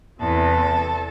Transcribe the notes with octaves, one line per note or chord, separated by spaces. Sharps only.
E2 C3 E3 A4